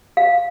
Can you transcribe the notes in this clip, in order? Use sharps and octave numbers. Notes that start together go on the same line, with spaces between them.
F5